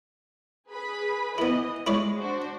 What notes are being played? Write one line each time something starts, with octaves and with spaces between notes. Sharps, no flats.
G#4 B4 B5
E3 B3 E4 D#5
G#3 E4 C#5 D5
D4 F#4 C5